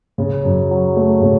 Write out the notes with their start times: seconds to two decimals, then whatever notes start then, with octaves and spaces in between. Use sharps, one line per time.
0.18 C#3
0.44 F#2
0.70 F#3
0.96 A3
1.21 C#3